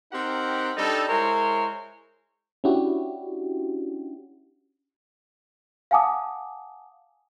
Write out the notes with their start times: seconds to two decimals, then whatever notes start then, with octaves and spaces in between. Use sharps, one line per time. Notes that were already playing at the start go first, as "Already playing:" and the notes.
0.12 C4 D#4 G4 A#4 F#5
0.77 G3 D4 D#4 A4
1.09 G#3 E4 A#4 C5 C#5
2.64 C#4 D4 E4 F#4 G4
5.91 F5 F#5 G#5 A5 D6 D#6